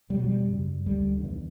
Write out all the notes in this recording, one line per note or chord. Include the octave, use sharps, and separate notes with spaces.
E2 B2 G3
F#3
G3
F#2 C#3
D2 D3 G3
D3
E2 E3
D3